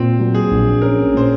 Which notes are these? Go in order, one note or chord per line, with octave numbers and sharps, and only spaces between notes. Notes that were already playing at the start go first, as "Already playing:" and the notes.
Already playing: A#2 C4
F#3
G#4
A#1
C#4 A#4
A#2 C5